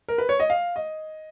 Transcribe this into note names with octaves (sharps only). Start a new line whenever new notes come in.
A#4
B4
C#5
D#5
F5
D#5